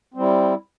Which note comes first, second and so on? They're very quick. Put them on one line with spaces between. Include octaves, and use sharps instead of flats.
C4 G3 E4